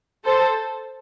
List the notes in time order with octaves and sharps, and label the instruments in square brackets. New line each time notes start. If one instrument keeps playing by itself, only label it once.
[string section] A4 C5